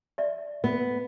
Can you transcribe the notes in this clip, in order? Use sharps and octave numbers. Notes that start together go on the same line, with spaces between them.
D5 E5
B3